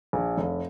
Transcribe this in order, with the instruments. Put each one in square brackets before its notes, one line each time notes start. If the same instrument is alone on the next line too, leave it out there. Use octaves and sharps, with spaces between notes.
[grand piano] A#1
F1